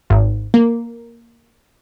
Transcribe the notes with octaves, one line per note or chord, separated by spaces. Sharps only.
G#1
A#3